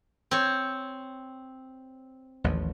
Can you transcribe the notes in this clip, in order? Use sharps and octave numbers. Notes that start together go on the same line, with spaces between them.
C4 C#5
A1 D#2 F3